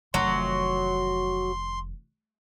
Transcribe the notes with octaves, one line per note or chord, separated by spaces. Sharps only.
F1 D#3 F#3 C6